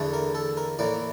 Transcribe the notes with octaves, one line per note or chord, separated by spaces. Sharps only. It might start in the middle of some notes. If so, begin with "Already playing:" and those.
Already playing: E2 D3 A3
A#4
A4
A#4
A2 E3 A#3 D5